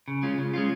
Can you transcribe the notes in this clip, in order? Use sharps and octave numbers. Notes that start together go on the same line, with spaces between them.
C#3
G#3 C#4 F4
C#3
G#3 C#4 F4